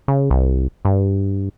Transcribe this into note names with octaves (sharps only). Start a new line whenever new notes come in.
C#3
C2
G2